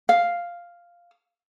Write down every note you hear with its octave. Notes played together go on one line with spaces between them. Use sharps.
F5